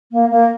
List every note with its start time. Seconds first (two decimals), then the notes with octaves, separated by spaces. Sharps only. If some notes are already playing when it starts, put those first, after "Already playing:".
0.12 A#3
0.31 A#3